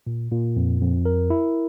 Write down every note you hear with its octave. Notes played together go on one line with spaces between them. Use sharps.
A#2
A#2
F2
F2
A#4
E4